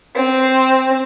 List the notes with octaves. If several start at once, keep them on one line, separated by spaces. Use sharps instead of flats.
C4